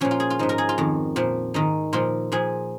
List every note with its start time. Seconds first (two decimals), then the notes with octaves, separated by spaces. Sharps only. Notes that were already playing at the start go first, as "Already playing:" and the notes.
0.01 A#2 F3 C#4
0.11 F4
0.20 G#4
0.30 F4
0.39 G#2 F3 D#4
0.49 A#4
0.58 G#4
0.69 F4
0.78 F2 D#3
1.16 A#2 F3
1.54 G#2 D#3 D#4
1.93 A#2 F3 F4
2.32 A#2 F3 G#4